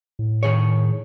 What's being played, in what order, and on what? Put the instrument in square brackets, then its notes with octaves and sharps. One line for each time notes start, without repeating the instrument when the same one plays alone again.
[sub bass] A2
[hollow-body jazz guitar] D#3 G#4 C#5